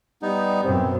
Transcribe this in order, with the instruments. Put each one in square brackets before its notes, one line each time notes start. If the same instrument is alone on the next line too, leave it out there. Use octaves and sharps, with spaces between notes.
[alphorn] G3 [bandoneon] B3 D#4
[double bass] F#2 B2 [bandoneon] B3 [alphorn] C4